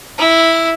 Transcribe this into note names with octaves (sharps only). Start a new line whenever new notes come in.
E4